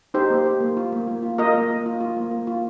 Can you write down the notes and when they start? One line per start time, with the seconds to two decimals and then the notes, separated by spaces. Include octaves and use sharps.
0.14 D#4 G4 C5
0.30 A#3
0.45 G4
0.60 A#3
0.77 F4
0.92 A#3
1.07 A#3
1.22 F4
1.38 F4 A#4 D#5
1.54 A#3
1.70 A#3
1.86 F4
2.00 F4
2.17 A#3
2.31 A#3
2.47 F4